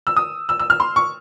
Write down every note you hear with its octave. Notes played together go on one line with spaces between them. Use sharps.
E6
D#6
E6
E6
F6
C6
C#6